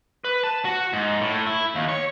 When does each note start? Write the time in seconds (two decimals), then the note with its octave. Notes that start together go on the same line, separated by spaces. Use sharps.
0.24 B4
0.44 A5
0.65 F#4
0.93 G#2
1.21 A2
1.47 E4
1.75 D#2
1.89 C#5